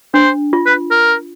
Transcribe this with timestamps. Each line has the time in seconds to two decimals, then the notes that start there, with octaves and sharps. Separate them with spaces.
0.14 D4 C5
0.53 F4
0.66 B4
0.91 A#4